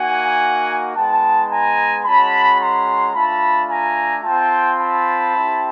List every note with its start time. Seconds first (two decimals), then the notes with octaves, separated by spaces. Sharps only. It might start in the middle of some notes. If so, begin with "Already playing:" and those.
Already playing: A#3 D#4 F#4 F#5 G#5
0.95 G#3 B3 D#4 G5 A5
1.51 G#5 A#5
2.05 G#3 C#4 F#4 A5 B5
2.60 A#5 C6
3.14 A3 D4 F4 A5 B5
3.69 G#5 A#5
4.23 C4 F4 G5 A5
4.78 A5 B5
5.33 C4 E4 G4